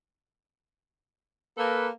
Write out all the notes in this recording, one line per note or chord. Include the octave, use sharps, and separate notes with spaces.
A#3 A4 B4